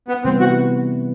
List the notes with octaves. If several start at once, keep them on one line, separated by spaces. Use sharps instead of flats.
B3
C3 E3 G3 B3 C4 E4
F#4